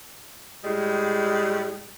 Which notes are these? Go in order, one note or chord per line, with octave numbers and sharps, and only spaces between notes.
A2 G3 G#3